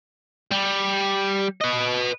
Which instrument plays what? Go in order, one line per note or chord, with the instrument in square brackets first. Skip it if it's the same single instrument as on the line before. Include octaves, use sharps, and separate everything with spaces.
[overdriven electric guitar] G3
B4 D#5